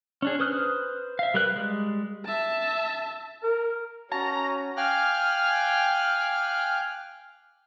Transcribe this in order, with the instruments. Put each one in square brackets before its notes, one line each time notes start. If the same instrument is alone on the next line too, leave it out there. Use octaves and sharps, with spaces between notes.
[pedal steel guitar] C#4 D4 G#4
B4 C5 D#6 F6 F#6
E5 F5
G3 A#4 B4 F#6
G3 G#3
[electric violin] E5 A5
[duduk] A#4
[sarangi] C#4 [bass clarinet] F#4 [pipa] A5 [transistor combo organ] A#5
[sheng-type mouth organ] F5 G5 G#5 D6 F6 F#6